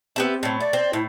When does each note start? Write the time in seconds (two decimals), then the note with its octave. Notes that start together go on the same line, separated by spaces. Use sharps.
0.16 B3 C4 G4 E5
0.43 A2 F#3
0.61 A3 D5
0.73 C4
0.93 A2 E4